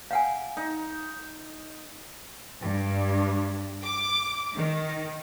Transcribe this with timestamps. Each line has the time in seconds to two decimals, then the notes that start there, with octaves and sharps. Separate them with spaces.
0.11 F5 F#5 G#5
0.57 D#4
2.62 G2
3.83 D6
4.53 D#3